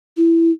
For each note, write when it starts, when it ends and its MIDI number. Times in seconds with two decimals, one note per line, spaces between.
0.17 0.51 64